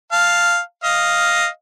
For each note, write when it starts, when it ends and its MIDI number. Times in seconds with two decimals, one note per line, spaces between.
0.12 0.59 77
0.12 0.59 81
0.84 1.47 75
0.84 1.47 77